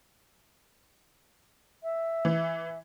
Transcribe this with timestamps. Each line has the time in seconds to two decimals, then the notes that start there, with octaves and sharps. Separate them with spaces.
1.83 E5
2.25 E3